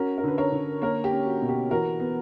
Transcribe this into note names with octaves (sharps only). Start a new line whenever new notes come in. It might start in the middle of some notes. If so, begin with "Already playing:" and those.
Already playing: C#4 F#4 A#4
A#4
D3 B4
A#4 C#5
D3
A#3 A#4 C#5
G4
C#4
F#4
B2
G4
E3 F#4 A#4
B3